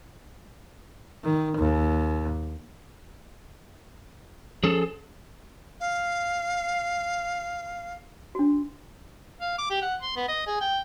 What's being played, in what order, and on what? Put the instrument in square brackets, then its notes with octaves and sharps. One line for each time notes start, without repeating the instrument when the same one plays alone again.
[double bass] D#3
D#2
[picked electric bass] F3 C#4 [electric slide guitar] G#4 A4
[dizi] F5
[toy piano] D4 F#4
[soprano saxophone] F5
D6
G4
F#5
C6
B3
D#5
G#4
G5